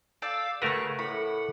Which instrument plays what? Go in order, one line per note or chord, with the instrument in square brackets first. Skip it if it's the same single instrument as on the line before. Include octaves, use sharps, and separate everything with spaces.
[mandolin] A4 D5 G6 [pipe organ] F5 D6 E6
[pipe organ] C#3 [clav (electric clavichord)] A3 A#4 B4 [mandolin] F#4 C#6
[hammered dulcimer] A2 D6 [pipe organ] F#5 [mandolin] B5